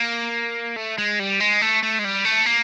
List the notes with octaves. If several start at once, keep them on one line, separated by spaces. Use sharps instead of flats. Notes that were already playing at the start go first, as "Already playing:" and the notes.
Already playing: A#3
A3
G#3
G3
G#3
A3
A3
G#3
G3
A3
A#3